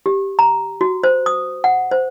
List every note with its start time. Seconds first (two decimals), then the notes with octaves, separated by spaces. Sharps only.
0.06 G4
0.39 A#5
0.81 F#4
1.04 C5
1.26 D#6
1.64 F#5
1.91 C5